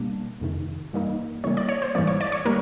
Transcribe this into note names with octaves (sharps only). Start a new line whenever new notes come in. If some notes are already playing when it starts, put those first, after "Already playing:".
Already playing: B2 G3 A#3 D4
F2 C3 D#3
G2 E3 G3 A#3 D#4
C#3 E3 G3 A#3 C#5
D5
C#5
C5
G#2 E3 G3 A#3 D5
C#5
D5
C#5
D#3 G3 A#3 A#4